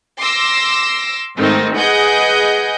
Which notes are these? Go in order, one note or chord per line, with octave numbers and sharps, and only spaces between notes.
C6 D6 E6 A#6
G#2 D#3 A3 C4 D#4
G#4 B4 D#5 F#5 G#5 G6